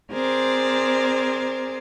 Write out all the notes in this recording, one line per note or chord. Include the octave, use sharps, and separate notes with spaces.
C4 G#4 A#4 C5 D5